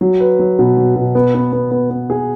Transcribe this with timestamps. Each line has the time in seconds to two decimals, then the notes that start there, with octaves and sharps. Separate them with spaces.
0.01 F#3
0.20 B4
0.39 F#3
0.59 B2
0.77 F#3
0.96 B2
1.15 B3
1.35 B3
1.53 B3
1.71 B3
1.90 B3
2.10 G#4